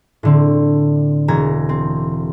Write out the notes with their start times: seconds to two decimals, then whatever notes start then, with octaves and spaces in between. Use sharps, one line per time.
0.23 A2 D3 C4
1.28 E1 A#5 G#6
1.69 C4